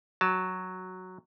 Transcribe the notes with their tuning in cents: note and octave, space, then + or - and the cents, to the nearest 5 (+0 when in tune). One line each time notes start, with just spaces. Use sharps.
F#3 +0 A5 +0